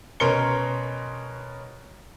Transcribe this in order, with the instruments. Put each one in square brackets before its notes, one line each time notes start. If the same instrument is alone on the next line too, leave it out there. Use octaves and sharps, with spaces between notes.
[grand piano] B2 C#4 A#4 C6 C#7 G7